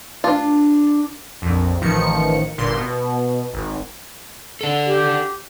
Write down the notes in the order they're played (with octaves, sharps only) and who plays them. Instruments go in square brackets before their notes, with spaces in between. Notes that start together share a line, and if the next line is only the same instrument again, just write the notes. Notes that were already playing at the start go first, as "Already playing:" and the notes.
[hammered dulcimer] D4 [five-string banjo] F4
[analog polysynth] A#1 F2
A1 D#3 F3 C#7
G1 A#2 C6
B2
G#1
[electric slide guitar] D4 A4
[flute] G4